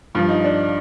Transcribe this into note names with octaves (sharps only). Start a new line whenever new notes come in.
G2 F3 F4
D#4
D4